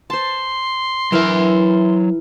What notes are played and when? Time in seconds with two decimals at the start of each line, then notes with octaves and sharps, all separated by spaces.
0.10 C5 A5 C6
1.12 E3 F#3 E4 A#4 E5